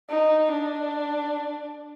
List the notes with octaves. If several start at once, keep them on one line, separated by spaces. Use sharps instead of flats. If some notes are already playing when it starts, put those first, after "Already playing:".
D#4
D4